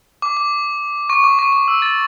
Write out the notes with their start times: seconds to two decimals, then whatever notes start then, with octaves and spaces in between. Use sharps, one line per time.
0.22 D6
0.37 D6
1.10 C#6
1.24 D6
1.39 C#6
1.53 D6
1.68 E6
1.82 A6